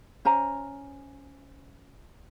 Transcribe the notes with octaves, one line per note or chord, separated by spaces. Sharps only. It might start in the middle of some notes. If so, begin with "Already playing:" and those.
C#4 C5 G#5 A#5